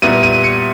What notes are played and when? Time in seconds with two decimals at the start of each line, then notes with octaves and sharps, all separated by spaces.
0.02 A#2 G3 B3 E4 D#7
0.23 D#7
0.44 C#7